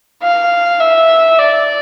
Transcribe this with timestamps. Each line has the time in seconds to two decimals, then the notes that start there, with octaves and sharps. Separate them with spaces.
0.23 F5
0.80 E5
1.39 D5